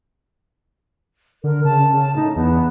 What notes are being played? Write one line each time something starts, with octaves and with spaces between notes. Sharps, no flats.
D3 A#4
C#3 A5
C#3
A2 D#4
E2 B3